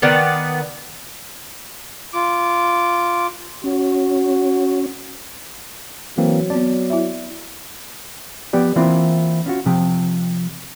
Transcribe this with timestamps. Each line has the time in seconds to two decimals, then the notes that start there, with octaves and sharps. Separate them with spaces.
0.02 D#3 B3 D5
2.13 F4 D6
3.64 C#4 F#4
6.18 E3 F#3 A#3 C4
6.50 B3 C4 D5
6.90 E4 E5
8.53 F3 B3 G4 D5
8.76 E3 A#3 C4 E4 F4
9.46 C#4 F4 F#4
9.66 C3 F3 G5